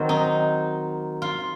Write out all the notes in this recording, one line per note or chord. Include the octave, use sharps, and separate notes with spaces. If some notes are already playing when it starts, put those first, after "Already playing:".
Already playing: D#3 F#3 C4
D#4
F4